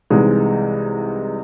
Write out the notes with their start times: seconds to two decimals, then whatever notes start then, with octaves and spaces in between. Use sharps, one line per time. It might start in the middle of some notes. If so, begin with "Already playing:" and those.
0.10 C2 C3 E3 G#3 D#4